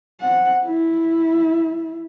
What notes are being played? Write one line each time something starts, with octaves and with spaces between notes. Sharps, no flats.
C4 F#5
E4